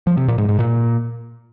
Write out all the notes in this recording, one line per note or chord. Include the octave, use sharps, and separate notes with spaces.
F3
C3
A#2
G#2
G#2
A#2